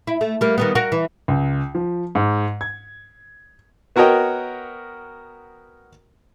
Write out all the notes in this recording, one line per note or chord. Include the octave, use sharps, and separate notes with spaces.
E4
A3
G3 A#3
D#3 G3 B3
F#4 A#4
E3
C#2
F3
G#2
G#6
B3 F#4 A#4 C#5 D#5 G5